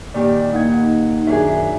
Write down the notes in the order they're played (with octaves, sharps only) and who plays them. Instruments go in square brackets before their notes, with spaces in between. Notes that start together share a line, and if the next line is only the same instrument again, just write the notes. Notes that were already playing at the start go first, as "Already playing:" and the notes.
[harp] A#2 D#3 G4 [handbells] D5
[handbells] A#3 F#5 G#6 [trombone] D#4
[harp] F#2 D4 G#4 [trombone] D#3 [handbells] E5